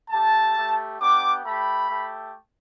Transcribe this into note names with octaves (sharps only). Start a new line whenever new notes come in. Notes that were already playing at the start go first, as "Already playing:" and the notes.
A3 G4 A5
A3 G4
B3 D4 G4 D6
A3 G4 B5
A3 G4